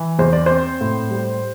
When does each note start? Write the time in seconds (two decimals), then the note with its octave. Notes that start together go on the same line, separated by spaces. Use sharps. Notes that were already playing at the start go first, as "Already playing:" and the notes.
Already playing: E3
0.19 E2 C5
0.33 D5
0.46 C4 C5
0.81 A2
1.11 G3